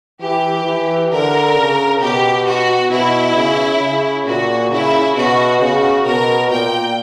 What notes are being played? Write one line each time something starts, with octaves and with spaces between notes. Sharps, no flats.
E3 G4
E3
D3 A#4
C#3
B2 G4
F#4
B2 E4
C#3
C#3
A#2 F#4
C#3 E4
B2 F#4
C#3 F#4
B2 A#4
A#2 G5